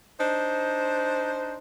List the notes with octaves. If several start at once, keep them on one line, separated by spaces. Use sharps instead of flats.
D4 D#4 C5